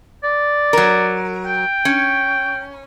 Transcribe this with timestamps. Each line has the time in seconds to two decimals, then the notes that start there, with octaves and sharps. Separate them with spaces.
0.23 D5
0.73 F#3 A#4
1.46 G5
1.85 C#4